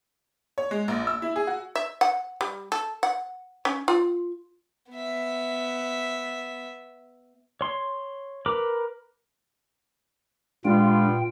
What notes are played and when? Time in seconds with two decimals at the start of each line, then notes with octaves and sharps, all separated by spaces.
0.58 C#5
0.71 G#3
0.88 A#1
1.07 E6
1.22 E4
1.36 G#4
1.47 F#4
1.75 E5
2.01 F#5
2.41 G3
2.72 A4
3.03 F#5
3.65 C#4
3.88 F4
4.92 B3 E5
7.61 C#5 C6
8.46 A#4 B4 D6
10.65 A#2 G3 G#3 B3 D4 F4 G5